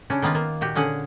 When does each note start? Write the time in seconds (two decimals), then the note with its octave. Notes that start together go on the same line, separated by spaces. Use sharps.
0.10 C#3 C#4 D4
0.22 D#3 A#3 B3 F4
0.35 A#3
0.61 A#2 F#4 G4
0.75 D3 C#4 G#4 F#5